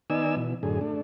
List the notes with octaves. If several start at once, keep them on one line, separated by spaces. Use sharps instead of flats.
D#3 B3 D#4 D5 G#5 E6
B2 E3
F#2 A2 D3 G#4
A3 D4